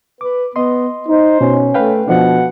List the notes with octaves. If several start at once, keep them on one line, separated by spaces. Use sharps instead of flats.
B4 D6
B3 D#5 C6
D#4 C5
B2 C#4
A3 B4 F5 G5
B2 F3 D4 F#5